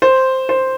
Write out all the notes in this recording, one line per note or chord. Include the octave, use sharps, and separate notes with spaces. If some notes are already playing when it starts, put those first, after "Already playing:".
C5
C5